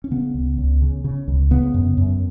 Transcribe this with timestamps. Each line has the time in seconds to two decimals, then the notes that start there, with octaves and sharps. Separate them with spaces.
0.04 C#4
0.11 C#3 B3
0.34 C#2
0.58 C#2
0.82 C#3
1.04 C#3
1.28 C#2
1.51 C#3 B3
1.74 F#2
1.97 F#2